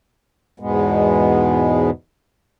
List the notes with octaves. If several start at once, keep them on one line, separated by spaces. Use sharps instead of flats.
E2 G#2 B2 G#3 B3